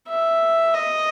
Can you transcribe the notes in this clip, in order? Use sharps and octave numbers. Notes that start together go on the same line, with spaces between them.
E5
D#5